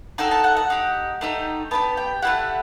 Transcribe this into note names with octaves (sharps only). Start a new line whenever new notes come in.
D#4 F#4 A4 G5
A5
F#5
F#5
D#4 G4
A3 D#4 G4
B3 D#4 G4 A5
G5
A3 C4 E4 G4 F#5